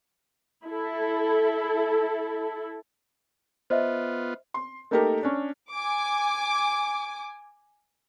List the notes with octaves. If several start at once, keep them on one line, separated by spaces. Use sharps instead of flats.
E4 A4
B3 F4 C5 D#5 E5
C6
A3 A#3 D#4 G4 A4 A#4
C#4 D4
G#5 D6